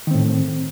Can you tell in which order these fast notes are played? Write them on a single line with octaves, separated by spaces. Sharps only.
D#3 C4 A2